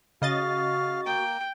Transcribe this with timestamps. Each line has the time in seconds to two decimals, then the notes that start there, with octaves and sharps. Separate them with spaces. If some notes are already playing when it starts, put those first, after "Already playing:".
0.22 C#3 F#4 D#5 F5 A6
1.06 A#3 G5